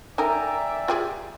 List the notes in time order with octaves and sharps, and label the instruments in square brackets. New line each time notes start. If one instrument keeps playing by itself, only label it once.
[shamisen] D#4 A4 A#4 [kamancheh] D5 E5 [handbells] G5 G#5 A#5
[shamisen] F4 G4 G#4